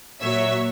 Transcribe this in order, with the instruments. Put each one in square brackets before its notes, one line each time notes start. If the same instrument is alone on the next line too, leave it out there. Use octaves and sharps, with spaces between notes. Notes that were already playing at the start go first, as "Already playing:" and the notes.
[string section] A#2 F#3 C#5 E5